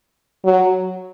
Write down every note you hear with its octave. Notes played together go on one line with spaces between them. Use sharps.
F#3